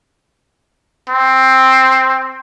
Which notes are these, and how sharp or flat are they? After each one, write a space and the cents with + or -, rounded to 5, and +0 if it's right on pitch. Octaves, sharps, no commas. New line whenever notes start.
C4 +5